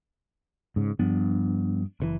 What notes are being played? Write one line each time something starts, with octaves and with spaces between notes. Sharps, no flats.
G#2 C#3
G2 F3 B3 D4
F#1 C3 E3